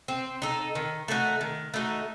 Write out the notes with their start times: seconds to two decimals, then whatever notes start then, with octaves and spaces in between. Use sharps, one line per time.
0.08 C4
0.42 D#4 A4
0.75 D#3
1.08 A3 D#4 F#4
1.41 D#3
1.74 A3 D#4 F#4